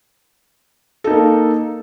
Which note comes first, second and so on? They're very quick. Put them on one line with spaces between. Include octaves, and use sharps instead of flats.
A4 D#4 A#3